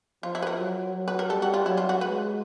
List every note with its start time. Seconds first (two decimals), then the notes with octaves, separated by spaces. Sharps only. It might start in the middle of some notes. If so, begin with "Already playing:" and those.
0.23 F3 F4
0.35 E4
0.42 B4
0.47 A#4
0.58 F#3
0.95 F#3
1.08 B4
1.19 A#4
1.30 G3 A4
1.42 F#4
1.54 F4
1.66 F#3 E4
1.77 F4
1.89 F#4
2.01 G#3 B4